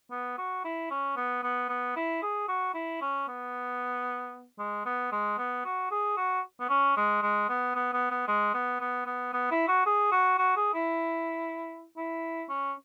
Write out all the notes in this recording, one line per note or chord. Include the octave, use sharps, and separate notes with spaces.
B3
F#4
E4
C#4
B3
B3
B3
E4
G#4
F#4
E4
C#4
B3
G#3
B3
G#3
B3
F#4
G#4
F#4
B3
C#4
G#3
G#3
B3
B3
B3
B3
G#3
B3
B3
B3
B3
E4
F#4
G#4
F#4
F#4
G#4
E4
E4
C#4